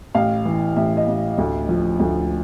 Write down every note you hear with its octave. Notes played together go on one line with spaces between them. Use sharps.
A1 F5
E3
A1 E5
D#5
A1
D2
F3
D2